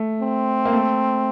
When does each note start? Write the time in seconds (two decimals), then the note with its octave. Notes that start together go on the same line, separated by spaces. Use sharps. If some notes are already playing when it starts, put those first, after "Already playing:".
Already playing: A3
0.21 C4
0.65 A#3
0.73 A3